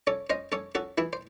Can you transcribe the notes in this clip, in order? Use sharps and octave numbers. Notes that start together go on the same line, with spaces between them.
C#4 A4 C#5
C#4 C5 D#5
C#4 A4 C#5
C#4 F#4 A4
E3 E4 G#4
C5